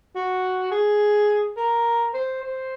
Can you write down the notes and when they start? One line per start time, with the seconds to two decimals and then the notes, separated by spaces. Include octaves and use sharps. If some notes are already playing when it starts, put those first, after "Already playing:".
0.15 F#4
0.71 G#4
1.57 A#4
2.14 C5
2.43 C5